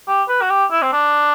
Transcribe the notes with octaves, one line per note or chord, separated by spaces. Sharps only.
G4
B4
F#4
G4
E4
C4
D4